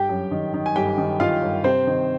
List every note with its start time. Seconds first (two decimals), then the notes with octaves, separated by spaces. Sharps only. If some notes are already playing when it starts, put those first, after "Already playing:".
Already playing: G1 G4 G5
0.09 F#2
0.31 D#3
0.54 D#3
0.66 G#5
0.76 G1 G4 G5
0.98 D#3
1.20 D#3 F4 F5
1.43 G1
1.64 C3 C4 C5
1.87 D#3